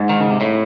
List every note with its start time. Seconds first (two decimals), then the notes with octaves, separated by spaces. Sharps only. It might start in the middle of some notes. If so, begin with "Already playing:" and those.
Already playing: G#2
0.09 D#3
0.20 C#3
0.30 C3
0.41 A2